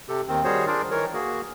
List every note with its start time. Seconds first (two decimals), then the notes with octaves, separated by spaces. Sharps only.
0.09 C3 G4 A4
0.28 D#2 D#3 C4
0.44 D#3 G3 F#4 G#4 C5 C#5
0.67 D4 F4 G#4 A#4 C5 D5
0.91 D#3 E3 A#4 C#5
1.14 A#3 F#4 G#4